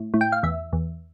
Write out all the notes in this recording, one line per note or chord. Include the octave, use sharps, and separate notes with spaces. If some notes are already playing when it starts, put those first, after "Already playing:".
Already playing: A2
A2
G5
F5
E2 E5
E2